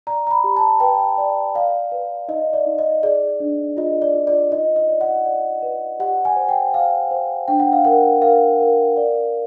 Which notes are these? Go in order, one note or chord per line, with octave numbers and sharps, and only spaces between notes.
D5 A#5
A#5
B5
G4
A5
B4 G5
D5
D5 F5
B4
D#4 D#5
D5
D#4
D#5
G#4 D5
D4
F4 D#5
D5
F4
D5
D#4 D#5
D#5
D5
F#5
D5
B4
G4 F#5
G#5
C5
G5
C5 F5
C5
D4 G5
F#5
F5
A#4 F#5
A#4 F5
A#4
D5